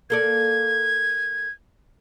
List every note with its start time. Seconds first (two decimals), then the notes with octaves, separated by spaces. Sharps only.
0.10 A#3 A4 D5 G#6